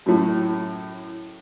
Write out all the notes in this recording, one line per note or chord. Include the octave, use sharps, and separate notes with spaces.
F#2 A2